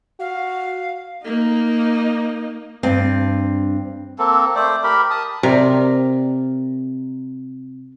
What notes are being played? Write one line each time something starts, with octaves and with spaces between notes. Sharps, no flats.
F#4 F5
A#3 D#4
G2 C4
A#3 C4 A4
A3 C5 D5
G4 A#4 B5
A5 D#6
C3 A#4 D5